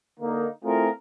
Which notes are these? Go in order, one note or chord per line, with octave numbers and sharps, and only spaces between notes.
D3 A#3 D#4
A3 C4 E4 F4 G#4 A#4